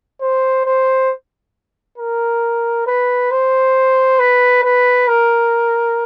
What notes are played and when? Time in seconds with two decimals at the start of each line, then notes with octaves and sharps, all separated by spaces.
0.21 C5
0.65 C5
1.98 A#4
2.87 B4
3.31 C5
4.19 B4
4.64 B4
5.08 A#4